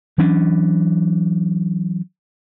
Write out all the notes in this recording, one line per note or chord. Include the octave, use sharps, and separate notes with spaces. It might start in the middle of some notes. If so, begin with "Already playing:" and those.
E3 F#3 C#4 D4